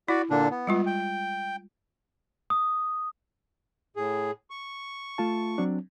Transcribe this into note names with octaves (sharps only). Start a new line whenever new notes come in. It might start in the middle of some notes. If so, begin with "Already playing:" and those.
E4 F#4 D5
A#2 D3 D4
B3
G3 G#3 F4
G5
D#6
A2 G#4
C#6
A3 F4 A5
F#3 C4 D4